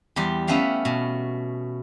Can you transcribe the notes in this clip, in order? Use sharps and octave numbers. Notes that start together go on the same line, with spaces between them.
E2 G3 G4 C6
A3 B3 C#4 E5 F5 G5
B2